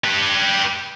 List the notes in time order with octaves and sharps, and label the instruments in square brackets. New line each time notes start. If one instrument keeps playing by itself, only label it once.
[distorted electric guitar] G4 B4